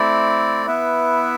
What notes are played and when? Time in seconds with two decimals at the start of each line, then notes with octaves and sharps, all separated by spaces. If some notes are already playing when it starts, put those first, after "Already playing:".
Already playing: A3 C4 E4 A4 D5
0.66 B3 E4 B4 E5